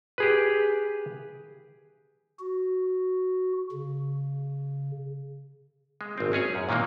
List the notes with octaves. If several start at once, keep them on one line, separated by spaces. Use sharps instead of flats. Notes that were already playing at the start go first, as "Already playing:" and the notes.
G4 G#4 B4
F#4
C#3
G#3
G#1 C4
G#3 C#4 G#4 C#5
F#2
A#2 D#3 E3 G#3 A#3